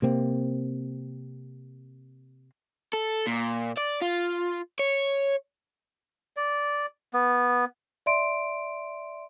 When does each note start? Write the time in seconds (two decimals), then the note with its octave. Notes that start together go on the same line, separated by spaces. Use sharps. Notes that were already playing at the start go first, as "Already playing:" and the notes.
0.02 C3 A#3 C4
2.93 A4
3.27 A#2
3.78 D5
4.02 F4
4.79 C#5
6.37 D5
7.14 B3
8.06 D5 E5 C6 D7